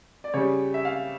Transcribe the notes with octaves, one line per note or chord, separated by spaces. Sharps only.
D5
C#3 G3 C#5
E5
F5